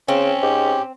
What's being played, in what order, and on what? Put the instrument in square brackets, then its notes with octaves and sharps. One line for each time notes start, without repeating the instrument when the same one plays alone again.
[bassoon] C#3 [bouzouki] C4 [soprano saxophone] C#4
[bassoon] G#2 [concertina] G4